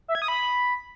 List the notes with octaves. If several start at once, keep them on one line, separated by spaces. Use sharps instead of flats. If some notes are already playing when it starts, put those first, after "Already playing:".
E5
G#6
D#6
B5